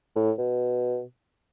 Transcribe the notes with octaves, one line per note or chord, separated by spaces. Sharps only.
A2
B2